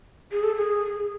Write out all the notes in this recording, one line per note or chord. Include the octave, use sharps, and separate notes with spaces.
G#4
A4
G#4